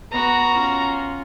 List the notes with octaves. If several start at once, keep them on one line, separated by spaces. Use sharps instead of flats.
B3 F#4 A#5 B5
C#4 F4